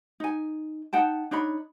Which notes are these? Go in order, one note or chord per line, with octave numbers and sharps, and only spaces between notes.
D#4 G#5
D#4 F#5 G5 A5
D4 D#4 C#5 B5